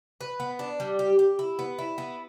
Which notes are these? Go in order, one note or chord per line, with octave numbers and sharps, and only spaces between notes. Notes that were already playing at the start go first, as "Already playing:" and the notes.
B4
B3
D4
G3
G4
G4
E4
B3
E4
B3